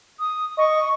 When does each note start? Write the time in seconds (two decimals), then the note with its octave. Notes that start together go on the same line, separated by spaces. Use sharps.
0.19 D#6
0.58 D#5 C#6